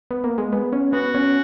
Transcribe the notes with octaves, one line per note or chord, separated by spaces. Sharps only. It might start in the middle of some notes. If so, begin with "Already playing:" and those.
B3
A#3
G#3
B3
C#4
B3 F#4
C#4